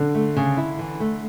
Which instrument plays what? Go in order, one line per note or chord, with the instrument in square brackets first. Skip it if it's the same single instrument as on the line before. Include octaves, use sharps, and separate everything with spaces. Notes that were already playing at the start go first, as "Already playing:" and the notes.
Already playing: [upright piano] D3
[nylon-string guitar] A3
C#3
E4
E3
A3